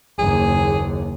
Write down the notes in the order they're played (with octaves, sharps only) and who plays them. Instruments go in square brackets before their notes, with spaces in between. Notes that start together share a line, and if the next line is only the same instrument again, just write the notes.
[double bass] F#1 D#2 [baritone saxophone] G#4